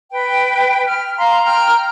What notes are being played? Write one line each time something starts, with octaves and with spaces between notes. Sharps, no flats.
B4 G5
F6
F5 A#5 C6
G5 A#5 F6